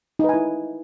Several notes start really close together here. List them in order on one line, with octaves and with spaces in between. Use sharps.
D#4 B4 G#5 E4